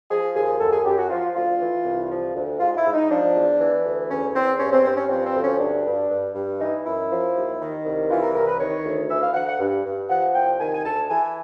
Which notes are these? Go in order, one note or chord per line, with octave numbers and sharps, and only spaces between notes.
F3 G#4
D#2 G#4
F#2 A4
G#4
F#2 G4
F#4
F3 F4
D2 F4
E3
C2
F3
D2
G#2 F4
E4
G#2
D#4
F3 D4
E2
E3
D2
E2 C#4
E2 C4
G2 C#4
C4
G2 C4
C#4
F3 C4
C4
D2
C#4
G2 D4
G2
G2
G2
E3 D#4
F#2 E4
F3
D#2
D#3
C2
E3 F4
A#4
C2 A#4
B4
D#3 C#5
D2
E3 E5
F5
D2 F#5
F#5
G2
G2
F3 F#5
C2 G5
D#3 G#5
G#5
D2 A5
E3 G#5